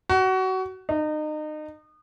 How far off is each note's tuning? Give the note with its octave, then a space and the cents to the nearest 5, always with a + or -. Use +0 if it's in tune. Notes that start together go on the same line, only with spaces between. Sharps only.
F#4 +25
D#4 -30